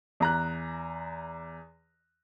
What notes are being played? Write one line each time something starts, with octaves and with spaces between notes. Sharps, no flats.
E2 A#5 F#6